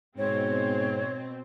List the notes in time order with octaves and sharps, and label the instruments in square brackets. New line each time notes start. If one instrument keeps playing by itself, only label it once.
[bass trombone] G#2 [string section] B2 C4 [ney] C#5